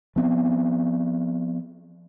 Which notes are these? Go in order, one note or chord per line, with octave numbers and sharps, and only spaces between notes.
F3 B3 C4